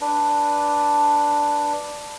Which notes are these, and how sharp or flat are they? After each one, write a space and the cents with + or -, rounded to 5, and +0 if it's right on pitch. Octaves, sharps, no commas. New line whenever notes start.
D4 +0 B4 +0